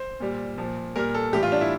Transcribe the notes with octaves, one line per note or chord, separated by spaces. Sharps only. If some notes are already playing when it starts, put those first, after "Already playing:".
Already playing: C5
A#2 G3
A#2 F3
A#2 G3 A#4
A4
A2 E3 G3 G4
F4
D4
E4